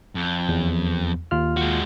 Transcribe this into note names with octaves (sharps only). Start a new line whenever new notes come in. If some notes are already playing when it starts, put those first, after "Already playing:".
F2
E2
D#2 F4 F6
G#3 F#4